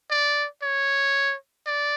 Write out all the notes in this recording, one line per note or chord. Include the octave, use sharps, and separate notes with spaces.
D5
C#5
D5